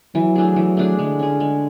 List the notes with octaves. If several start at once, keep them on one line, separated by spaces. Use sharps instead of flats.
E3 F#3
A3 D4 G#4
E3
A3 D4 G#4
D3 G#3
C#4 G#4
G#3